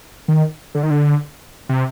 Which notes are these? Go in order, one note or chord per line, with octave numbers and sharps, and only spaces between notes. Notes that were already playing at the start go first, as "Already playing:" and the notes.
D#3
D3
D#3
D3
C3